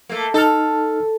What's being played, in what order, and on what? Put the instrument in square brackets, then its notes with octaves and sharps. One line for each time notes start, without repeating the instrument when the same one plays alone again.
[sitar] A3 A#3
[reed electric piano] D#4 F6 [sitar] A4